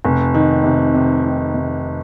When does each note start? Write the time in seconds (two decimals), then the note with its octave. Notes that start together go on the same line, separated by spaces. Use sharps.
0.05 F1
0.35 D#3
0.64 C3
0.94 C3
1.24 D#3
1.54 C3